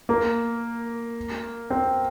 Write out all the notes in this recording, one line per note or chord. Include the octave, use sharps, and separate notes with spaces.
A#3
C4